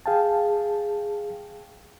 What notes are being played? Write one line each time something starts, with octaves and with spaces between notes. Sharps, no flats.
G#4 F5 G5 A5